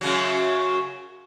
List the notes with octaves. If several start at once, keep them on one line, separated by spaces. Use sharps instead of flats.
F#2 C#3 F#3